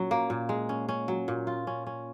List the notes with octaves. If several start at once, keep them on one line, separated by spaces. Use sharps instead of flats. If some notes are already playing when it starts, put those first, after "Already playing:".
Already playing: A#2 F#3 C#4
A#3
A#2
G#3
C#4
C#4
F#3
A#2
F4
C#4
C#4